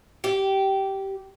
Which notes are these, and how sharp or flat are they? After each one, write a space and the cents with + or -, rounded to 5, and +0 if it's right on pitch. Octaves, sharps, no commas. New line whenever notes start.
G4 -15